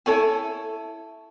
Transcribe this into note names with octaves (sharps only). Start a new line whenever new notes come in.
E4 A4 C#5 G#5